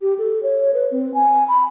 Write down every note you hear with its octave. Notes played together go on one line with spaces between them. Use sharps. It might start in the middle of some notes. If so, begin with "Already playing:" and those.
G4
A4
C#5
B4
C4
G#5
B5